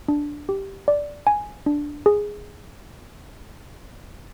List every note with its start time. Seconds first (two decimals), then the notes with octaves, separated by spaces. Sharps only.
0.08 D4
0.49 G4
0.88 D5
1.27 G#5
1.66 D4
2.06 G#4